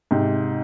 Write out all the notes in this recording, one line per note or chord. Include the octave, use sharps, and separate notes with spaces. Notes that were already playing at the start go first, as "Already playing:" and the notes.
G#2 C3